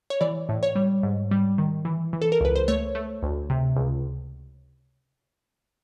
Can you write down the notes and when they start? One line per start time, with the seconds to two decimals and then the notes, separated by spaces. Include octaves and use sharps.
0.10 C#5
0.21 E3 D5
0.49 A2
0.63 C#5
0.75 G3
1.03 G#2
1.31 G3
1.58 D#3
1.85 E3
2.13 E3
2.22 A4
2.32 A#4
2.41 C#2 B4
2.56 C5
2.68 A3 C#5
2.95 A3
3.23 D2
3.50 C3
3.76 C#2